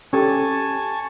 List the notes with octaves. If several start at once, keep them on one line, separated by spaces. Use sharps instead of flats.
C#4 G4 A4 G#5 A5 C#6